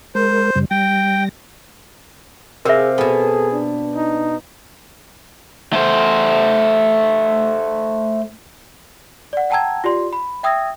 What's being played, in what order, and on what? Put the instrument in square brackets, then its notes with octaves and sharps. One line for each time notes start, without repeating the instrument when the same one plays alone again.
[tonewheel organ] G#3 A#4 [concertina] C5
[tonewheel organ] F#2 C#3 G3
[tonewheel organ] G3 A#6 [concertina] G5
[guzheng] C3 F5 [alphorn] G#4 [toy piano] A#4 E5
[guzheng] B2 B3 [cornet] G#4 [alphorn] A4
[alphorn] D4
[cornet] D#4
[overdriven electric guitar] A3 C5
[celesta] D5 F#5
F#5 G5 A5 A#5 E6 G#6
F4 G4 D5 C6
B5
E5 G5 D#6 E6 G#6 A#6